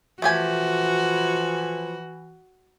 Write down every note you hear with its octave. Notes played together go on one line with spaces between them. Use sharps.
E3 F3 A3 F#4 G4 G#5